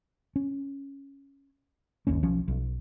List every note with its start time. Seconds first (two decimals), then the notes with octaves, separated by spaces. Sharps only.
0.36 C#4
2.07 G1 D#2 A#3 C#4
2.22 B1 F3 C#4
2.48 B1